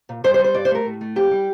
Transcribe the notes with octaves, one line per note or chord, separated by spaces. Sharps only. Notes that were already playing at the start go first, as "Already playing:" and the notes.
A#2
G2 C5
C5
G3
C5
G2 D5
C5
A3 A#4
A2
A3
F2 G4
G3